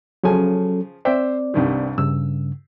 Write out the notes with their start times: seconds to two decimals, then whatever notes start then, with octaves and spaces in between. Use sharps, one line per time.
0.24 C#3 F3 F#3 C#4 A4 G#5
1.05 C4 C5 D5 E5 G5
1.54 C2 G2 D#3
1.98 G2 C#3 E6